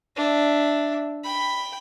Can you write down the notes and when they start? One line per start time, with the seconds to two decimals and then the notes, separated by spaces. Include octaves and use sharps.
0.16 D4 E5
1.24 G5 B5